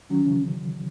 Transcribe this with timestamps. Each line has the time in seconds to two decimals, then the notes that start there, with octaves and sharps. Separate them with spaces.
0.10 D#3 F#3 C#4
0.25 C#3 E3